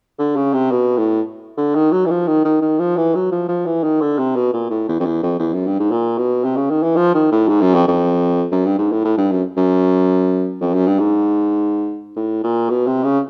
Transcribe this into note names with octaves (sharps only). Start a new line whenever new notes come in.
D3
C#3
C3
B2
A2
D3
D#3
F#3
E3
F3
D#3
D#3
D#3
F3
E3
F#3
F3
F3
E3
D#3
D3
C3
B2
A#2
A2
E2
F2
E2
F2
E2
F#2
G2
G#2
A#2
B2
C3
C#3
D#3
E3
F3
D#3
A2
G#2
F#2
F2
F2
F#2
G2
G#2
A2
A2
G2
F#2
F#2
F2
F#2
G2
G#2
A2
A#2
B2
C3
C#3